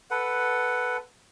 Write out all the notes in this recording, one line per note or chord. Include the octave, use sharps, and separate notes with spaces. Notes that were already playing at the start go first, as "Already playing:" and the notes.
A4 B4 F#5